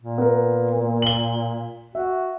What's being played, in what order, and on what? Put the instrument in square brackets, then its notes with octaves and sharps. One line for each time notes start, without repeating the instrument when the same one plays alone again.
[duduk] A#2
[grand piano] B3 A#4
A#3
F#7 G7
[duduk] F#4 [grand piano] E5